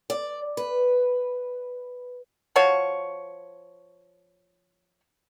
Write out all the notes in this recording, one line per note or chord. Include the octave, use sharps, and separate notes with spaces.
D5
B4
F3 F#4 C#5